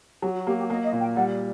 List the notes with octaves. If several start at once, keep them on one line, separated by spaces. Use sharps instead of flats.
F#3 G4
F#4
A#3 G4
G4
A#3 D#5
D#5
A#2
G5
G3 F#5